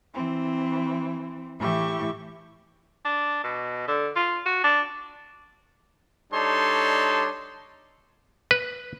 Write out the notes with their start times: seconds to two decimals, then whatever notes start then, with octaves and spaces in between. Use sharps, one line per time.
0.14 E3 C4
1.58 A2 E3 G4 E5 C#6
3.05 D4
3.44 B2
3.88 D3
4.16 F4
4.45 F#4
4.64 D4
6.33 G3 D4 D#4 A4 C#5 C6
8.51 B4